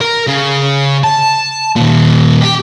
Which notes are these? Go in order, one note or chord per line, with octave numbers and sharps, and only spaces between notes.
A#4
C#3
A5
D#2 A#2
G4